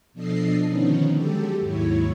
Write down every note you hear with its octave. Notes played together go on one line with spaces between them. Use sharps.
B2 F3 D4 A4 D#5 C7
D3 D#3 F3 B3 C#4 D#4
F#3 G#3 G4 A4
D#2 G#2 F#3 E4 C#5